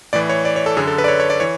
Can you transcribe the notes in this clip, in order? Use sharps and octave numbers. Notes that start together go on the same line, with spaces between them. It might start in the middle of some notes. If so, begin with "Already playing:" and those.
A2 E3 D5
C#5
D5
C#5
A4
F#2 D3 G#4
A4
B4
D5
C#5
C#5
D5
E3 C#5